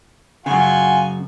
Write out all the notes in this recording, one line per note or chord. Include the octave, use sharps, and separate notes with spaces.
F#2 C#3 F4 F#4 G#5